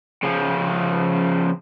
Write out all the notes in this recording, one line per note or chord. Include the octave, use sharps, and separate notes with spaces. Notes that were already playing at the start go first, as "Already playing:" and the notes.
C#3 F3